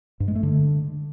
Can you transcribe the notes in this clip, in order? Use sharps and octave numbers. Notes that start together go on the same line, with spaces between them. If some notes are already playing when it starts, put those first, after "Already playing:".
G2
G#3
A3
D3